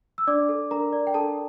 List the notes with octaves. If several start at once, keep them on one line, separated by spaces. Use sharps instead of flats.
E6
D4 D5 D6
A4
D4 A#4 A#5
D5
G5
D4 A4 A5